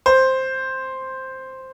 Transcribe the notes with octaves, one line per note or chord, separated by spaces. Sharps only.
C5